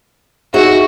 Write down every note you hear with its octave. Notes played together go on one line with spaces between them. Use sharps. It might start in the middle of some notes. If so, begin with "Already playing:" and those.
D#4 F#4 G#4 E5